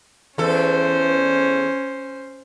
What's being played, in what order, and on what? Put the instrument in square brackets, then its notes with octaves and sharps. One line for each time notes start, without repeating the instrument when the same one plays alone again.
[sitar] E2 A4 [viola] C#4 C5